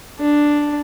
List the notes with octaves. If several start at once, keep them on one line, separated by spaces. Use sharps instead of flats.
D4